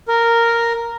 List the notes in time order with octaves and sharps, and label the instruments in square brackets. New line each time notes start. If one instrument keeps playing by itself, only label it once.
[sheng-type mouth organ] A#4